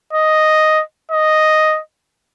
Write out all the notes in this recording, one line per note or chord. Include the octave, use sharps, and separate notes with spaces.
D#5
D#5